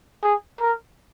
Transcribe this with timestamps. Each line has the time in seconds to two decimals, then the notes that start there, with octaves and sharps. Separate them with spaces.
0.23 G#4
0.61 A#4